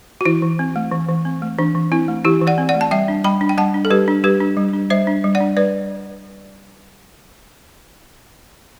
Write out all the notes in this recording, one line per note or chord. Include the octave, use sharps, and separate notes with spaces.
F#4
E3 E4
E3
C4
A3
E3
E3
C4
A3
E3 D4
E3
C4 E4
A3
E3 E4 G4
E3
D5 F#5
C4
D5 F#5
A3
A5
G3 E5 G5
D4
G3 G5 B5
D4
G5
G3 F#5 A5
D4
A4
G3 G4 B4
D4
G3 G4 B4
D4
G3
D4
G3 C5 E5
D4
G3
D5 F#5
D4
G3 B4 D5